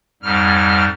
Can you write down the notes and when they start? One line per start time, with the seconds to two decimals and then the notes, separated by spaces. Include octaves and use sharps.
0.22 F2 G#2 G3 F6